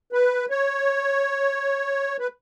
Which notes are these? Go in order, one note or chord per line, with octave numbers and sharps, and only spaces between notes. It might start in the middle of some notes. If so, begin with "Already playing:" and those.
B4
C#5
B4